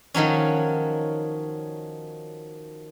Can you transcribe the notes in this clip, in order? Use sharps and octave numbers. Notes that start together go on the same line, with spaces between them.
D#3 F3 F#3 C#4